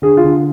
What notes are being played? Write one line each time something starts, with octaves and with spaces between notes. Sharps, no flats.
D3 G#4
F4
D3